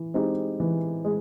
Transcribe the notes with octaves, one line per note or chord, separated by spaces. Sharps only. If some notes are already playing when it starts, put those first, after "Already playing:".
Already playing: E3
G#3 C4 D#4 G4
E3
G#3